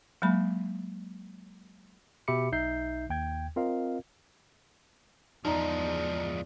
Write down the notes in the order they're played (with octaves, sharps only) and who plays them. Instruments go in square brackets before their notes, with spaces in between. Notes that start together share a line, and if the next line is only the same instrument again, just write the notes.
[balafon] F#3 G#3 A#3 B5
[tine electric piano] B2 G4 E5 B5 D6 C#7
B1 D#4 E5 G6 C7
D#2 G5 G#6
C4 F4 A#4 D#5 F5
[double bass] E2 [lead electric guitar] F3 G#3 [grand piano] D#4 A#5 [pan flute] D5